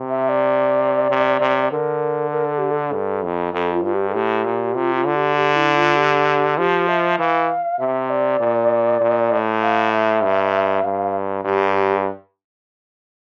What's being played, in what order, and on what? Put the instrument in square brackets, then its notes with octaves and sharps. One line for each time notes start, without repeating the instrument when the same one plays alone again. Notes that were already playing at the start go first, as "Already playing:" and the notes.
Already playing: [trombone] C3
[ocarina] E5
D5
[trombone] C3
C3
[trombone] D3 [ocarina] A#4
[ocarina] A#4
A4
G4
A4
[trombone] G2
F2
[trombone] F2 [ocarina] A4
[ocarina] F4
[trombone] G2 [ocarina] F4
[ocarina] G4
A4
[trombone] A2 [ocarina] G4
[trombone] A#2
[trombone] C3 [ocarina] F4
[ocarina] F4
[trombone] D3
[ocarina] G4
G4
E4
F4
G4
[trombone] F3 [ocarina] G4
[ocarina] E5
[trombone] E3 [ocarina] F5
[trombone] C3 [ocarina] E5
[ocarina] D5
[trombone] A#2
A#2
A2
[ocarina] F5
E5
[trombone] G2
[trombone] G2 [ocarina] F5
[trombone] G2 [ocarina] G4